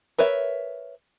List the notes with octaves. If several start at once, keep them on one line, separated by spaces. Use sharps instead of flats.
A#4 B4 C#5 E5